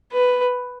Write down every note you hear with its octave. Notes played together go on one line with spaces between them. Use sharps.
B4